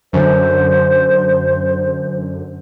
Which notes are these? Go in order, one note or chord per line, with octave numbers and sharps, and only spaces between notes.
F#2 D3 C5